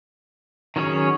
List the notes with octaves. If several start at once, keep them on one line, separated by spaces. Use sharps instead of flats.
D#3 F#3 C#4 G#4 C#5